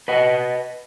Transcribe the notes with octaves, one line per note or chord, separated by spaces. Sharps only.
B4 D#5 F#5